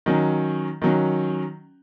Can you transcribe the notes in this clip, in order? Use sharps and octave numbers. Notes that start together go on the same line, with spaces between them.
D#3 F#3 C#4
D#3 F#3 C#4